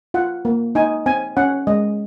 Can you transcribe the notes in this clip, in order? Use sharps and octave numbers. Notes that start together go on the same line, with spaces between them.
F4 F#5
A#3
D#4 G#5
C4 G#5
C#4 F#5
G#3 D#5